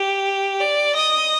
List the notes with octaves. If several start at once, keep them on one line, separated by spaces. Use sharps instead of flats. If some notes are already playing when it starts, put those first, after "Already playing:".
Already playing: G4
D5
D#5